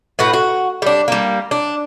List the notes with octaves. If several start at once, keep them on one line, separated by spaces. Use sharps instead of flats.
A2 F#4 B4
F#4
G3 D4
G3 A#3
D4